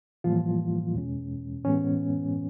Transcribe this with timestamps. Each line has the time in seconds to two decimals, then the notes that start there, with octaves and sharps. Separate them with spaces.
0.24 A2 E3 F3 G3 A#3 F4
0.94 E2 B2 G#3 C#4
1.65 A2 E3 G#3 B3 C#4